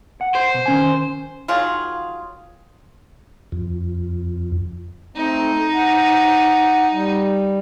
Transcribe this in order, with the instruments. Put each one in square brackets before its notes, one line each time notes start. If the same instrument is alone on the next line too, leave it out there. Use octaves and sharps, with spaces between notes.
[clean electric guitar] F#5
[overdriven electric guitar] C5
[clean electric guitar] B2
D#3 C#4 G#5
[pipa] D#3 F#3 F4 G#4
[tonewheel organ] F2
[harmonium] A3 C4 [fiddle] D#4
[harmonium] F#5
G3